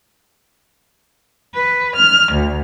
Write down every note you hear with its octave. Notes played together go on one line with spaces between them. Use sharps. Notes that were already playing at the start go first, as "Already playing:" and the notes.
B4
F6
D2